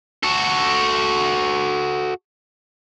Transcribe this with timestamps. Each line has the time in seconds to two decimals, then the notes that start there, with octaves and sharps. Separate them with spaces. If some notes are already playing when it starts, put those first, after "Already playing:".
0.23 F#4 A4